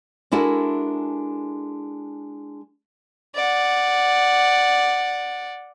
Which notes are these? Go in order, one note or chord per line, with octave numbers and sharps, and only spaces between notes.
G#3 D4 E4 F#4 A4 A#4
D5 F#5